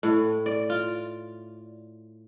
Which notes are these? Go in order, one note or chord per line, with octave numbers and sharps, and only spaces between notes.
A2
D5
F4